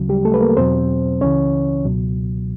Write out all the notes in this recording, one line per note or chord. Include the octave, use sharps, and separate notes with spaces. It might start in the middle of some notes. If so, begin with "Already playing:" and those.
Already playing: D2 C#3 F#3
G3 G4
A3 A4
B4
A#3 A#4
E2 B2 F#3 C4 C5
C#2 C#3 E3 C#4 C#5
C#2 B2 F#3